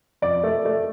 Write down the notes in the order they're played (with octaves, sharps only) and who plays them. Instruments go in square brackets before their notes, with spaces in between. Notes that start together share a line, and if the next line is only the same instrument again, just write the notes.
[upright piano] F2 D5
A3
A3